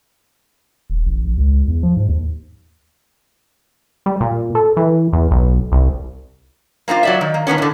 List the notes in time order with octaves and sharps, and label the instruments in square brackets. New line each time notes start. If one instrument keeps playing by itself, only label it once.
[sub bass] D#1
A1
A#1
C#2
E2
F3
G#2
D#2
[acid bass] G3
A#2
A4
E3
E2
B1
C2
[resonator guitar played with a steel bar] A#3 C4 D#4 F4
F#3 D5 E5
D#3
A#3
D#3 F3 B3 C#4
A2 D3